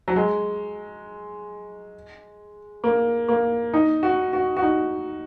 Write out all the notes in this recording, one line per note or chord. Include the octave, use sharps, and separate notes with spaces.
F#3
G#3
A#3
A#3
D#4
F#4
F#4
F#4
D#4